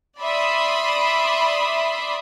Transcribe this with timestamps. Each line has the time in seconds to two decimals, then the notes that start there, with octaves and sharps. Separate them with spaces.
0.20 D5 E5 B5 C6 D#6